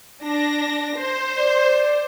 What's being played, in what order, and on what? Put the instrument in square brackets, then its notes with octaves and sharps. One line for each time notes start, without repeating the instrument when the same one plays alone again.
[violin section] D4 A#6
C5
[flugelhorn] D5